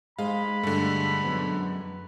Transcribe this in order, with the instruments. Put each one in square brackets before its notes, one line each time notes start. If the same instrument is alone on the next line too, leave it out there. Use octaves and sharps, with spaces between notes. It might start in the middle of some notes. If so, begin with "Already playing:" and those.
[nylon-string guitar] G#3 D#4 C5 [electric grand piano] F5 [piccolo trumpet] B5
[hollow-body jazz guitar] G2 [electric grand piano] D3 A3
[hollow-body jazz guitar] F#2 F#3 B3